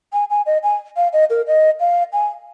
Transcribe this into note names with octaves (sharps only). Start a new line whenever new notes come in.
G#5
G#5
D#5
G#5
F5
D#5
A#4
D#5
F5
G#5